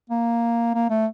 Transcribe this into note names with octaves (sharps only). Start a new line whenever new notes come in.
A#3
A#3
A3